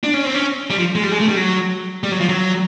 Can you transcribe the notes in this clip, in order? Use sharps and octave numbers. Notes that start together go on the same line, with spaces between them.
D4
C#4
C4
C#4
G3
F3
G#3
G3
G#3
A3
G3
F#3
G3
F#3
F3
F#3